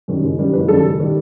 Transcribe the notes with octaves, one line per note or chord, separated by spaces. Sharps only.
F#2 D#3 G3
F#1
F#2 D#3 G3
F#1 B4
F#2 D#3 G3 A4
F#1
D#3 G3